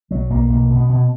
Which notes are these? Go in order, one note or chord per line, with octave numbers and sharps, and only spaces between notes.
B1 F#3
B1 A#3
B2 A#3
B2
B3
B2